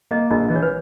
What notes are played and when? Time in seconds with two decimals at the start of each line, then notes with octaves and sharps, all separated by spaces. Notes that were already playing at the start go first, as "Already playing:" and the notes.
0.11 A#3 D#5
0.31 A#1 D#5
0.48 E3 D#5
0.56 C#5
0.63 B4